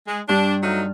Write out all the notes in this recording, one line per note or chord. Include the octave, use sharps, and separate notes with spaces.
G#3
G2 D4
F#3 A3 D#4 F6